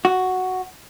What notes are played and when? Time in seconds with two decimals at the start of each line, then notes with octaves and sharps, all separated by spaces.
0.05 F#4